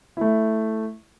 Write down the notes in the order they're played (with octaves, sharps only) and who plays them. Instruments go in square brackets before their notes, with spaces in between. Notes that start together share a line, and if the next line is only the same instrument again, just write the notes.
[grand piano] A3 E4